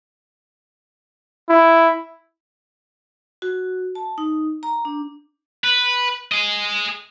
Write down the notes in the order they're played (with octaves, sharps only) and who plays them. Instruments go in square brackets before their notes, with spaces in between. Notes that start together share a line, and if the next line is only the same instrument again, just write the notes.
[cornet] E4
[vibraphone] F#4
A5
D#4
A#5
D4
[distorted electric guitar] B4
G#4 D#5